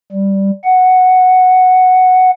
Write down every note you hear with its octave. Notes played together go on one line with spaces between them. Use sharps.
G3
F#5